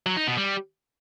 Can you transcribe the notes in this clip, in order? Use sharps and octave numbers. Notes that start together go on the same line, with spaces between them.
F#3
D#4
B2
G3